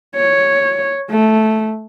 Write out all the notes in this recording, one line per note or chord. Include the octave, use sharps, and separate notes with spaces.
C#5
A3